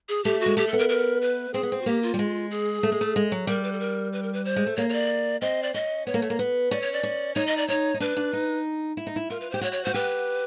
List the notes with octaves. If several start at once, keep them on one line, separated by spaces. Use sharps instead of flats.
G#4
A3 G4
F#4
G#3
A3 G4
A4
B3
A#4
A#4
B4
C4 G#4
B3
C4
F#4
A#3 G4
F4
G3
G#3
G#4
A3
G#3
A3
G#3
F#3
G3 A#4
B4
A4
A#4
B4
A#4
B4
C5
G#3
A3
A#3 C#5
C#5
D5
C4 D#5
D5
C#4 D#5
B3 C#5
A#3
A3
A#3
B3
C#4 D5
C#5
D5
C#4
D#4 C#5
D#5
D5
D#4 C#5
D#4
D4 B4
D4
D#4
E4
D#4
E4
F4 A#4
B4
G4 C5
F#4 C#5
C#5
F#4 C5
G4 B4